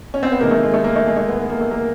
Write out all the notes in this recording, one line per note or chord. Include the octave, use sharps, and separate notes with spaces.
C#4
C4
B3
C3 D#3 G#3 A#3
A3
G#3
A3
A#3
A3
G#3
A3
B3
B3
A#3
A3
A#3